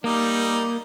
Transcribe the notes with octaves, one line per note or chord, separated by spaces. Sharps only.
G3 A#3 D#4 D5